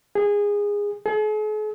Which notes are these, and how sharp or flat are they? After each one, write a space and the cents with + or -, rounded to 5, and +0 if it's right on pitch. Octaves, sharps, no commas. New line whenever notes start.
G#4 -20
G#4 +45